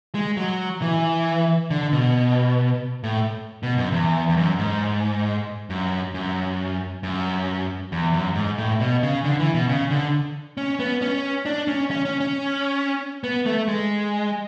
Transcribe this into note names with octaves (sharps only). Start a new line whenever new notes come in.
G#3
F#3
E3
D3
B2
A2
B2
F#2
E2
E2
F#2
G#2
F#2
F#2
F#2
E2
F#2
G#2
A2
B2
C#3
D3
E3
B2
C#3
D3
C#4
B3
C#4
D4
C#4
C#4
C#4
C#4
B3
A3
G#3